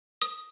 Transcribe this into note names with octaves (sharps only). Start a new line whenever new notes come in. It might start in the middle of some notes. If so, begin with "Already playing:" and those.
D#6